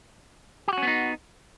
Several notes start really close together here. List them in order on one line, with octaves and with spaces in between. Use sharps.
G4 F#4 C#4 B3 D#4